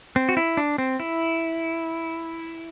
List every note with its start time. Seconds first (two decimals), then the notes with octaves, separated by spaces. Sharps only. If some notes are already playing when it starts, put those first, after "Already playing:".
0.16 C4
0.29 F#4
0.37 E4
0.57 D4
0.78 C4
1.00 E4